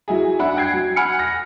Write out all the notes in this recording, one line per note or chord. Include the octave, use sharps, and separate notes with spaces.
F#3 E4 G#4
D4 E5 F#5 B5
F#5 G5 G#6 C7
F#3
F#5 G#5 B5 F6 C#7
A#6